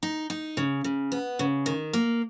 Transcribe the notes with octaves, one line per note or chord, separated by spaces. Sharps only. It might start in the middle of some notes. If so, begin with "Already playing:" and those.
D#4
D#4
C#3
C#3
B3
C#3
D#3
A#3